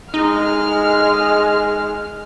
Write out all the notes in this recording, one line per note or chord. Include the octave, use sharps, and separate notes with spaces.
G#3 D#4 F6